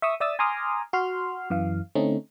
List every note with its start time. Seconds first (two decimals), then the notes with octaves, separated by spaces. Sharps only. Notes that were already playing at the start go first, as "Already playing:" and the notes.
0.02 E5 C#6 D#6 E6
0.20 D5 E5 D#6 E6 A6
0.39 G#5 A#5 C6 D6 D#6 F6
0.93 F#4 C6 F6
1.50 F#2 E3 F5
1.95 D3 A3 C4 C#4 D#4